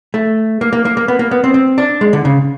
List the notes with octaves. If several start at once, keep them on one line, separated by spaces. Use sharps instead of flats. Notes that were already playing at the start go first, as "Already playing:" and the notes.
A3
A#3
A#3
A#3
A#3
B3
A#3
B3
C4
C4
D4
G#3
D3
C#3